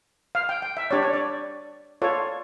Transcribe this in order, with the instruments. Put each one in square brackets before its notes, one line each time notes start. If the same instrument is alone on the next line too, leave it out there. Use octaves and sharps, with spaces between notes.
[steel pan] F5
G5
G5
E5
D4 G4 C#5 D5
C#5
D5
F4 A4 C#5 D5